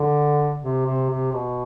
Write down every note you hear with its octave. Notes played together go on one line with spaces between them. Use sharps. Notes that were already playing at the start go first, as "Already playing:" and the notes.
Already playing: D3
C3
C3
C3
B2